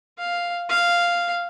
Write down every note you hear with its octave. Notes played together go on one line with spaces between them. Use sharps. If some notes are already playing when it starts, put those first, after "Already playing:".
F5
F5